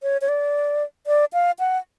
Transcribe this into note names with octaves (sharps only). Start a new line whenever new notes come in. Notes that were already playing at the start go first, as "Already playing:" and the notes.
C#5
C#5
D5
D5
F5
F#5